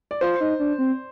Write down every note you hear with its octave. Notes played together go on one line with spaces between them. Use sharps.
D5
F4 C5
D#4
D4
C4